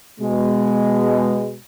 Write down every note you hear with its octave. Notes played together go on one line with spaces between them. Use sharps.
B2 G#3